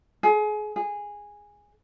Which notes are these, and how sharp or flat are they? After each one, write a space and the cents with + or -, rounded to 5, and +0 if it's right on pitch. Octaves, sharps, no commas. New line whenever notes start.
G#4 +30
G#4 -10